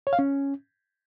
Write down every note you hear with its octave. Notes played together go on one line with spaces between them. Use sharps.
C#5
F5
C#4